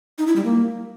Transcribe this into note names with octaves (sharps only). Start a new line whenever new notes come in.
D#4
E4
G3
A#3